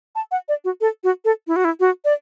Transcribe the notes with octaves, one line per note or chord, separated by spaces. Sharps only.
A5
F#5
D5
F#4
A4
F#4
A4
E4
F#4
E4
F#4
D5